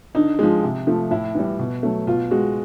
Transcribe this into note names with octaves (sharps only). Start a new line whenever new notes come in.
D3 D#4
F3 G#3
C3
F3 A3
A2 E4
E3 G3
B2
F#3 A3
B2 F4
G#3 F#4